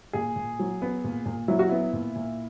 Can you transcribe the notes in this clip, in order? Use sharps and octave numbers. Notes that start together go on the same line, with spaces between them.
A#2 G#4
A#2
F#3
B3
A#2
A#2
F#3 E4
F#4
B3 E4
A#2
A#2